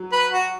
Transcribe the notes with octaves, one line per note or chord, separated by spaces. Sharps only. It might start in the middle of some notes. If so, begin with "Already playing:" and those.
Already playing: F#3
B4
F#4